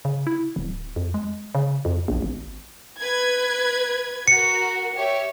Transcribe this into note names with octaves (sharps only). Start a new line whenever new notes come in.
C#3
E4
D1
F2
G#3
C#3
F2
A#1
G#1
B4 G#6
F#4 A#4 C#7
G4 C#5 E5